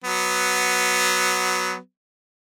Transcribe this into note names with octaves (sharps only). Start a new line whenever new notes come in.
F#3 B3